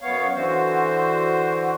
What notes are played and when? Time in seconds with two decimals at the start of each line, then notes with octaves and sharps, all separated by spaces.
0.01 F#2 B3 C#5 F5
0.35 D3 E3 F#4 C5